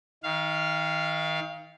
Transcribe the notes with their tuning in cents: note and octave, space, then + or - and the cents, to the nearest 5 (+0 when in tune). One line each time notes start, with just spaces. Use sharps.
D#3 +30 F5 -15